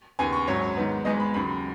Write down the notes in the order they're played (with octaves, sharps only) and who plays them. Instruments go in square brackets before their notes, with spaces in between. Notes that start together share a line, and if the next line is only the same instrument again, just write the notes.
[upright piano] D#2 C#3 B3 G#5
C#6
G#1 F#2 F#3 C#5
G#2 D#3 B3
G#1 G#2 G#3 B3 D#5
B5
D#2 C#3 F#3 B5